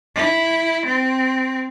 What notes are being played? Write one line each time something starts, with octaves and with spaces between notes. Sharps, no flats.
E4
C4